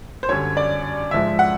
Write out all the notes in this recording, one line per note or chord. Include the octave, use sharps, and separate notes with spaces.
C5
F#2 D3 G3 C#5
D5
G#2 F3 G#3 E5
F#5